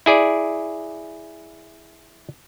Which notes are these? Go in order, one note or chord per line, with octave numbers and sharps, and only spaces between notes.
E4 G#4 D5